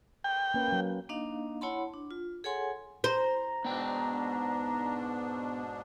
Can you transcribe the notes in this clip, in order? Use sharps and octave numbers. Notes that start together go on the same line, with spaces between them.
G5
A#3 C#4 B4
F#3 C#4
A#3 D4 D#4 D#5 F5
E4 C#5 F#5 A5 B5 C6
D4
F4
G#4 A4 C#5 F#5 G#5 C6
C5 A#5
G#2 B2 B3 D4 G5